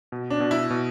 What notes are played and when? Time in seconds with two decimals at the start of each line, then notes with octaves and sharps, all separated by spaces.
0.12 B2
0.30 D4
0.40 B2
0.51 E4
0.71 B2